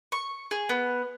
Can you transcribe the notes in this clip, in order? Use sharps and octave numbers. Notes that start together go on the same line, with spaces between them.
C#6
G#4
B3